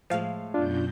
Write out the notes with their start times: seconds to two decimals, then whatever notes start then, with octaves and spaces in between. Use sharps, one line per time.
0.10 A2 F3 G#3 F5
0.54 F#2 B2 D4 F4 G6